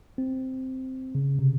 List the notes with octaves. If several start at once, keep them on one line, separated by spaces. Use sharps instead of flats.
C4
C#3
C3